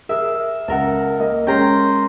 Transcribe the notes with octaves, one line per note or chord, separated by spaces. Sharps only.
G#4 A#4 E5
C#2 A4 A#4 F#5
A#3 D#5
G#3 C#4 G5 A#5 C6